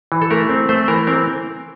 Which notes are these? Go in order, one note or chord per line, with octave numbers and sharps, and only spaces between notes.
E3
A4
A3 A#4
C4
A3 C5
E3 A#4
C4 A#4